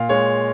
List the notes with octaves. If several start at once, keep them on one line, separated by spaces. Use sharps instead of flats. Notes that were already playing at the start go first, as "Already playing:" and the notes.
Already playing: A#2 F5
G#3 C#5